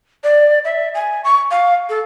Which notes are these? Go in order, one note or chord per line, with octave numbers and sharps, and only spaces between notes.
D5
E5
G#5
C#6
F5
A4